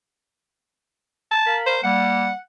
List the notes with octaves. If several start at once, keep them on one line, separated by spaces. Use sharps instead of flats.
A5
A#4 F5 B5
C5
G3 A#3 F#5